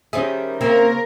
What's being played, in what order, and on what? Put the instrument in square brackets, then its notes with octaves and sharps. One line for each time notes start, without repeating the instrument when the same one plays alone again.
[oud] D#3 G3 G#4 [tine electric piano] C#4 C5 E5
[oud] C#3 A#3 C4 [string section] A#4